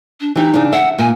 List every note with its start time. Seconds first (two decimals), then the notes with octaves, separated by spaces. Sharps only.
0.21 D4
0.35 E3 D#4 G4
0.54 C#3 D4
0.72 E5 F#5
0.98 A#2 G#5